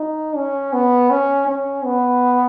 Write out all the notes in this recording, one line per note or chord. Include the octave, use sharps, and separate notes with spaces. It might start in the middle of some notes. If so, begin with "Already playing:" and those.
Already playing: D#4
C#4
B3
C#4
C#4
B3